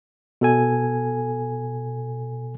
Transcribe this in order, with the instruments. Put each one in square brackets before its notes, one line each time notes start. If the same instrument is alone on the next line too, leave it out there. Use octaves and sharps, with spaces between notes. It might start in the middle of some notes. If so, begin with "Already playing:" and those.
[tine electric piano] B2 A4 G#5